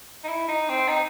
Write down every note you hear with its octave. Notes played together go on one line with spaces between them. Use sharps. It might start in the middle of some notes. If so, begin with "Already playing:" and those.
D#4
E4
D#4
C4
D#4